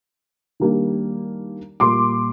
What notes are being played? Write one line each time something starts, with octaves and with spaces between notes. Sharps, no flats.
D#3 G3 A#3 D4
A#2 G3 A#3 C6 D6